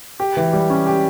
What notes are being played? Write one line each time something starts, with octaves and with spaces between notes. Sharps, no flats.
G4
E3
G3
C#4
G4